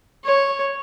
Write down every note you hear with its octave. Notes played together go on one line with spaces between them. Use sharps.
C#5